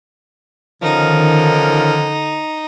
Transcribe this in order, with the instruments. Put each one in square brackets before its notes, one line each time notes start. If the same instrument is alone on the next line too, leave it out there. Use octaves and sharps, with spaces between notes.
[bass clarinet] D3 [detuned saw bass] D#3 [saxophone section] F3 C#4 A#4 [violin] D#4